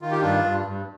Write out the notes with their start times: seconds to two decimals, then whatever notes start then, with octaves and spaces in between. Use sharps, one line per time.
0.02 D#3 F4
0.11 G4
0.21 G2 D4 F4
0.44 G2
0.65 G2